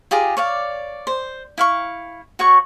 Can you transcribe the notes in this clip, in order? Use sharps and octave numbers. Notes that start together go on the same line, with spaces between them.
F4 G4 G#4 A#5
C#5 D5 F5
C5
E4 F5 C#6
F#4 C#5 C#6